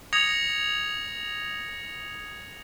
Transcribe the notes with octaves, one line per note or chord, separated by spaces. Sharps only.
D#6 G#6 A#6 C#7 F7